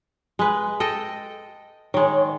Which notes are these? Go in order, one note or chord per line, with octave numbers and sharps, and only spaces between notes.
G#3 B4
A4 D#5 G5
D#3 G#3 C#5